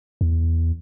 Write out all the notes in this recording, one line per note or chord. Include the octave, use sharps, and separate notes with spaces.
E2